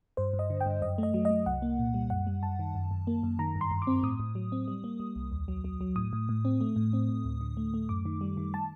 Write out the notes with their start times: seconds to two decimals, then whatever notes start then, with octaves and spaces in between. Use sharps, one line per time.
0.17 G2 C5
0.34 G2
0.39 D#5
0.50 D3
0.61 G5
0.66 G2
0.82 F#2 D#5
0.98 A3 D#5
1.14 F#3
1.25 D#5
1.30 F#3
1.46 C2 F#5
1.62 A#3
1.79 A#2
1.94 G3
2.10 F#2 F#5
2.27 G3
2.43 F#2 A5
2.59 D#3
2.75 F#2
2.91 F#2
3.07 A#3
3.23 F#2
3.39 D#3 A#5
3.56 G2
3.61 C6
3.71 G2
3.82 D6
3.87 C4
4.03 A2 D#6
4.20 A2
4.35 F#3
4.52 C4
4.68 G3
4.84 A#3
5.00 G3
5.16 C2
5.32 D#2
5.48 F#3
5.64 F#3
5.81 F#3
5.96 A2 D#6
6.13 A2
6.29 A2
6.45 C4
6.61 A3
6.76 A2
6.93 C4
7.09 A2
7.25 D2
7.41 D3
7.57 A3
7.74 A3
7.89 F#2 D6
8.05 D#3
8.21 G3
8.37 D#3
8.54 A5